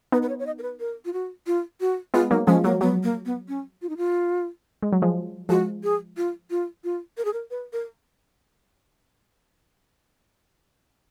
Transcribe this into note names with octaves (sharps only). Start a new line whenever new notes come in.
B3 D#4 B4
B4
C#5
C#5
D#5
A#4
B4
A#4
F4
F#4
F4
F#4
G#3 B3 F4
F#3 A#3 D#4
F3 G#3 C#4
F#3 A#3
F#3 B3
A#3
B3
C#4
F4
D#4
F4
G#3
F#3
F3 G#3
F3 G#3 F#4
G#4
F4
F4
F4
A#4
G#4
A#4
B4
A#4